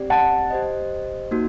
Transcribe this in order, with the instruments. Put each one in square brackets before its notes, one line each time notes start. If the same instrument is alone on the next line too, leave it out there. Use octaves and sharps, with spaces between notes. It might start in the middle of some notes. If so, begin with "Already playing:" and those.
Already playing: [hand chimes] C4 G4 D5
[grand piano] F#5 A5
[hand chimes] G4 C5 D#5
A#3 D#4 F#4